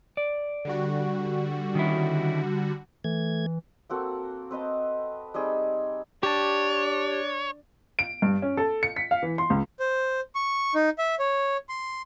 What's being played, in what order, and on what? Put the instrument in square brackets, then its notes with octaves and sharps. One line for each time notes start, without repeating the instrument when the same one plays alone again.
[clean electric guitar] D5
[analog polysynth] D3 G3 F#4
[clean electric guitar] D#3 C#4 E4
[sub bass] E3 [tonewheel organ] A3 G#6
[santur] A#3 C4 F#4 A4
C4 B4 D#5 A5
G3 C4 D#4 G#4
[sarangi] D4 [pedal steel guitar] G4 A5 [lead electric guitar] C#5
[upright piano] D7
G2
C#4
A4
C#7
B6
F5
E3
C6
C#2
[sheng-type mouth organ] C5
C#6
D#4
E5
C#5
C6